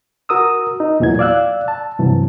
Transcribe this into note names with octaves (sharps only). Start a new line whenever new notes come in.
F#4 A#4 D#6 E6
D#4
E2 A#2 E3 F#3 G#6
D5 F5 E6 F#6
A5
G2 C3 E3 F#3